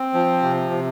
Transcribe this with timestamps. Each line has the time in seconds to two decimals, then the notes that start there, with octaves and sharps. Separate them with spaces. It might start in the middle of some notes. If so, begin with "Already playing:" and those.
Already playing: C4
0.14 F3
0.42 C3
0.71 C3